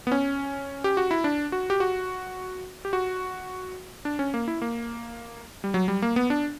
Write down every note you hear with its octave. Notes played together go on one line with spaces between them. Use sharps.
B3
C#4
G4
F#4
E4
D4
F#4
G4
F#4
G4
F#4
D4
C#4
A#3
E4
A#3
G3
F#3
G3
A#3
B3
D4